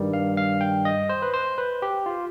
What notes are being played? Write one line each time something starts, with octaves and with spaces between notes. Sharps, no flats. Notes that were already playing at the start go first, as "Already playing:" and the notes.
Already playing: G2 D#3 G3
F5
F5
G5
D#5
C5
B4
C5
B4
G4
F4